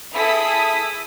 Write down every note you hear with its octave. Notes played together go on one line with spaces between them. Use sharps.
E4 G#4 A4 D#6 B6